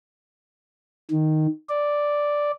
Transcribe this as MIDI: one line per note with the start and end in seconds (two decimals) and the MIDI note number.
1.11 1.47 51
1.69 2.51 74